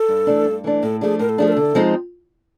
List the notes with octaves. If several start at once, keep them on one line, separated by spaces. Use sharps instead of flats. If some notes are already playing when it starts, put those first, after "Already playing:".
Already playing: A4
G2
E3 A3 D4
G2
E3 A3 D4
A2 A4
F3 A3 D4 G#4
A2 A#4
A4
F3 A3 D4 G#4
A#4
D3 A4
F3 G#3 C4 D#4